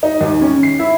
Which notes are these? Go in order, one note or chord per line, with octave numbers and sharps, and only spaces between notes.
D#4
D#2
C#4
C7
E4